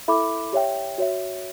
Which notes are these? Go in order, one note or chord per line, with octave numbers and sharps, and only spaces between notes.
E4 A4 E5 B5 D6
G4 C#5 E5 G5
F#4 C#5 E5